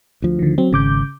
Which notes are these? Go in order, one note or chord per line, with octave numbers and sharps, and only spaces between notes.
D2 F3
D3 D#3
F#3 C4
G#1 C#3 D6 G6